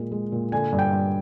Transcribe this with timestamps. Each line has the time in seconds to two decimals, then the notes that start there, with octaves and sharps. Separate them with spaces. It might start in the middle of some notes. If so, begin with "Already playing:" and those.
Already playing: A#2 G#3
0.12 G#3
0.32 A#2
0.52 D3 G#5
0.72 G2
0.79 G5
0.92 G2